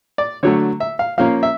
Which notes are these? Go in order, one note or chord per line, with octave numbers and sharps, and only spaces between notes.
D5
D3 F#3 A3 C#5
E5
F5
F3 A#3 C#4 F5
E5